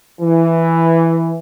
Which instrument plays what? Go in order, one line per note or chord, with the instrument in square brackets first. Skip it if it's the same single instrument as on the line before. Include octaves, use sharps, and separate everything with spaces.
[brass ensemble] E3